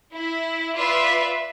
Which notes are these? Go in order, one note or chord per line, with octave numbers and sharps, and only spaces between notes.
E4
F4 B4 D5 E5